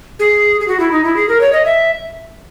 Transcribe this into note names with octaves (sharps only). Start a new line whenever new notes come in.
G#4
G#4
F#4
E4
D#4
E4
G#4
A#4
C#5
D#5
E5